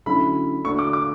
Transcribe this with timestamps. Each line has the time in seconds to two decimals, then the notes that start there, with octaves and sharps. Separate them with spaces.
0.06 D3 F#3 A3 C#4 E4 B5
0.64 D3 A3 D4 F#4 C#6
0.79 D6
0.93 D6